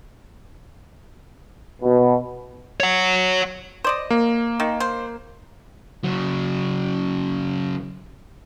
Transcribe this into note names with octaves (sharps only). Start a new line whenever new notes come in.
B2
C#5 F#5
C5 D5 D#5
A#3
D#3
C5
C#3 F#3